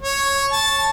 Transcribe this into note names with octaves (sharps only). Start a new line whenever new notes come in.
C#5
A5